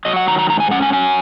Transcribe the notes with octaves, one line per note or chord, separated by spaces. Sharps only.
F#3 D#5
F#5
D#3 A#5
A#5
G#2 A#5
G#5
C#4 F#5
G#5
F#3 G#5